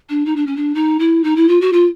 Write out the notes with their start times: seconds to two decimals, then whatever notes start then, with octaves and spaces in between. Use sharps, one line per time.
0.09 D4
0.25 D#4
0.36 D4
0.47 C#4
0.56 D4
0.75 D#4
0.99 E4
1.24 D#4
1.36 E4
1.48 F4
1.61 F#4
1.73 F4